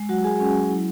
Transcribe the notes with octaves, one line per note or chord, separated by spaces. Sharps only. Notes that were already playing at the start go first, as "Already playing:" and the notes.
Already playing: G#3
F#3 F#4 F#5
F#4 G#4 G#5
C#4
F#3
E4